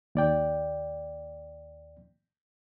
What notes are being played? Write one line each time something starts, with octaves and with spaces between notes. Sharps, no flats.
D#2 D5 G5